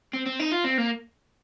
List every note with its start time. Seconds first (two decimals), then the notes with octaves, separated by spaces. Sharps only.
0.13 C4
0.26 C4
0.39 D#4
0.52 F4
0.64 C4
0.78 A#3